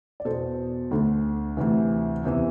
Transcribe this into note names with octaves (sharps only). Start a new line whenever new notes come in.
D5
E2 B2 A4 C5
D2 D3
D2 C3 E3
E2 C3 E3